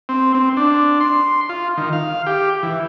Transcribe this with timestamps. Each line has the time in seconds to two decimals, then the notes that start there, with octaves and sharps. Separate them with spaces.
0.09 C4
0.35 C4
0.57 D4
1.00 C6
1.49 F4
1.77 D#3
1.93 F5
2.27 G4
2.63 E3